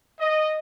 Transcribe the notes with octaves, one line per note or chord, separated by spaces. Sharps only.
D#5